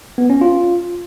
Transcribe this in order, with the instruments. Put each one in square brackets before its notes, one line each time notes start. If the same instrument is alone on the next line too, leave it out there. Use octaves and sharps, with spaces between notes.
[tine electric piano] B3
C#4
F4